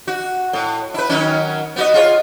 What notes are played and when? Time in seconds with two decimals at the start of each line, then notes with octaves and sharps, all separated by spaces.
0.08 F#4
0.53 A2
0.94 E4 B4
1.09 D#3 F#3 C#4
1.76 B3 F#4 D#5
1.94 F4 G#4 C#5